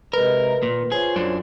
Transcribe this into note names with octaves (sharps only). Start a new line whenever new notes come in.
C3 G#3 A#4 B4
A#2
D#3
F4 G#4 C5 C#5
F#2 D4